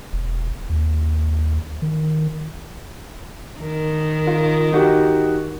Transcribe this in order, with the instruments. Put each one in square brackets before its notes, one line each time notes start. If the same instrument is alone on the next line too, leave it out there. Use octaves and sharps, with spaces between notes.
[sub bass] E1
D#2
D#3
[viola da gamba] D#3
[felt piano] F4
D#4 F#4 G4